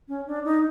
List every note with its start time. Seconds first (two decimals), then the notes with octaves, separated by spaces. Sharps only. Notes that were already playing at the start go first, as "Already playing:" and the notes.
0.08 C#4
0.27 D4
0.45 D#4